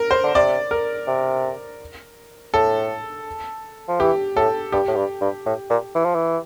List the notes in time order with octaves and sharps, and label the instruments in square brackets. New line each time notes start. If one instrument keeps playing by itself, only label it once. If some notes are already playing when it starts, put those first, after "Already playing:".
Already playing: [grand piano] A#4
C5
[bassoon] D3
[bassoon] C3 [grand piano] D5
[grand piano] A#4
[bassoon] C3
[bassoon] A2 [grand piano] A4
[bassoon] F3
[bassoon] E3 [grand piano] G4
[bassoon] A2 [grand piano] A4
[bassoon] G2 [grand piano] G4
[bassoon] A2
G2
G2
A2
A#2
E3
F3
E3